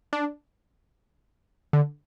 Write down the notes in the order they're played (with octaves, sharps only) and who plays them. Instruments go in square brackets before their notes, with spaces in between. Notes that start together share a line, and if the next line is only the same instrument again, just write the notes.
[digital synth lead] D4
D3